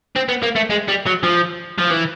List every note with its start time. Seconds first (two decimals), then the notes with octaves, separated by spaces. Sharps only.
0.16 C4
0.29 B3
0.43 A#3
0.56 A3
0.70 G#3
0.88 G3
1.06 F#3
1.23 F3
1.79 F3
1.91 E3